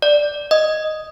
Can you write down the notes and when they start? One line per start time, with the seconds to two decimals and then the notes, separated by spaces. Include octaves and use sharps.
0.02 D5
0.51 D#5 D#6